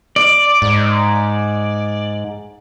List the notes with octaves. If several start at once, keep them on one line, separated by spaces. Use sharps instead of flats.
D5
G#2